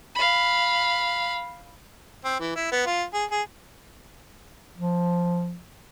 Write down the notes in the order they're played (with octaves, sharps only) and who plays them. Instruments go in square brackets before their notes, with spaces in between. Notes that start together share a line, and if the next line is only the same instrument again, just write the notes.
[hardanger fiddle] F5 B5
[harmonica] C4
E3
E4
B3
F4
G#4
G#4
[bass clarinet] F3